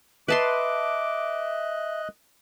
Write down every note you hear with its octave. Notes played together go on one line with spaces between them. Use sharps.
B4 D#5 E5 A5 C6 D6 F#6